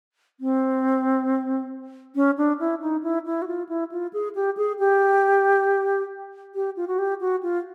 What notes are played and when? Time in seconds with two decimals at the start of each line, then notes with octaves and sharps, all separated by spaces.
0.40 C4
2.16 C#4
2.38 D4
2.60 E4
2.82 D#4
3.03 E4
3.26 E4
3.42 F#4
3.48 F4
3.69 E4
3.92 F4
4.13 G#4
4.35 G4
4.57 G#4
4.79 G4
6.55 G4
6.77 F4
6.88 F#4
6.99 G4
7.21 F#4
7.43 F4